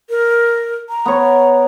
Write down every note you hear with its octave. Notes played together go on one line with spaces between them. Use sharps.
A#4
A#5
B3 C#5